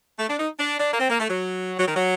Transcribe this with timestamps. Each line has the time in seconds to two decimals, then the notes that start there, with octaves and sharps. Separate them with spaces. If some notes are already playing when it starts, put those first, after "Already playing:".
0.19 A3
0.29 D4
0.39 D#4
0.59 D4
0.79 D4
0.93 A#3
1.00 C4
1.10 A#3
1.20 A3
1.29 F#3
1.79 F#3
1.88 D#3
1.96 F#3